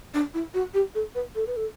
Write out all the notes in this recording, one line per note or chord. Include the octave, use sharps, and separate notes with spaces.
D4
E4
F#4
G4
A4
B4
A4
B4
A4